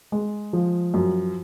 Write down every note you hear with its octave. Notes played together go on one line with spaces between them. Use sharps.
G#3
F3
F#2